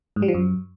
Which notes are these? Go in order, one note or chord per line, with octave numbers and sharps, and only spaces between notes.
G#2
G3
F3
F#2